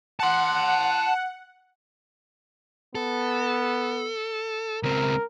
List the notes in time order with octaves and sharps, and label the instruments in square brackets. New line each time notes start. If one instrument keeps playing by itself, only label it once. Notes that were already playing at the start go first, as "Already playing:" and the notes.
[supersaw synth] F#5 [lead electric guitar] A5 C6
[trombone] B3 [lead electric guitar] A4
[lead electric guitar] C#2 C4 [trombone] A#4